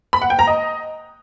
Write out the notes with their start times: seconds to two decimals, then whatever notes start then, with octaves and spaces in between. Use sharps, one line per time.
0.13 B5
0.22 F#5
0.30 G5
0.39 A#5
0.47 D#5